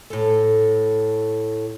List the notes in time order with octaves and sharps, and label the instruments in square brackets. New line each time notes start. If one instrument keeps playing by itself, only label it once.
[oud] A2 A4